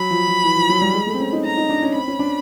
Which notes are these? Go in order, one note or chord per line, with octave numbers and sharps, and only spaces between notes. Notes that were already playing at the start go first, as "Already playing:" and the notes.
Already playing: F#3 B5
F3
F3
E3
F3
F#3
G3
G#3
A3
C4
C#4
D#4
D#4 A#5
D#4
D4
C#4
C4 B5
C#4
D4